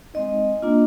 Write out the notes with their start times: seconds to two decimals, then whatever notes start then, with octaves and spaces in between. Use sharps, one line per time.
0.14 G#3 C4 D#4 D#5
0.63 A#3 D4 F4